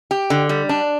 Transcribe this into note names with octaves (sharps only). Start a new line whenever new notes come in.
G4
D3
G3
D4